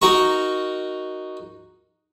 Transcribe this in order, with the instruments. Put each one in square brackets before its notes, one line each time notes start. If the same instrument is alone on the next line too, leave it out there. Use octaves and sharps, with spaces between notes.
[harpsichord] D#4 F#4 A#4 C#6